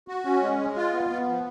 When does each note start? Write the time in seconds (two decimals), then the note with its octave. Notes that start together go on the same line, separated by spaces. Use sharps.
0.08 F#4
0.25 C#4
0.42 G#3
0.59 G#3
0.76 F4
0.93 B3
1.10 B3
1.28 F3